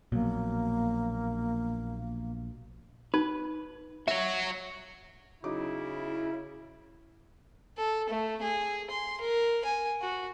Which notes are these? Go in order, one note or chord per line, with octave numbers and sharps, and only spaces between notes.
A#1 B2 F#3 A#3
D#4 B4
F#4 C#5 E5
C#3 F#3 D#4 E4 D6
A4
A3
G#4
C6
A#4
G#5
F#4